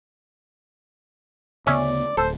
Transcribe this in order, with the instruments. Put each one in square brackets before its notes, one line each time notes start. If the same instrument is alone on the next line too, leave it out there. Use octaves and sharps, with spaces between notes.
[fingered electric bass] D2 C#3 B3 [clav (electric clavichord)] C#4 E5 [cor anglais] D5
[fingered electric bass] D1 [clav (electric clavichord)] A4 [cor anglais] C5